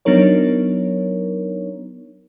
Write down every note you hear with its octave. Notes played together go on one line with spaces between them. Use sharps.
F#3 B3 D4 D#4 A#4 C#5